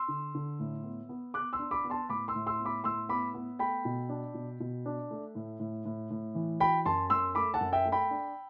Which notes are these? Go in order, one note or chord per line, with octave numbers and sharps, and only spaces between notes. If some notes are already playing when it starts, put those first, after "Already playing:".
Already playing: C6 E6
D3
D3
A2
B3
B3
B3 D6 F#6
C6 E6
D4
B5 D6
B3
A5 C6
A2 B5 D6
C6 E6
A2
C6 E6
B3
B5 D6
A2 C6 E6
B3 B5 D6
B3
A3 G5 B5
B2
D4
B2
B2
D4
A3
A2
A2
A2
A2
E3
F#3 G5 B5
F#2 A5 C6
F#2 C6 E6
A3 B5 D6
F#5 A5
F#2
E5 G5
A3
G5 B5
D4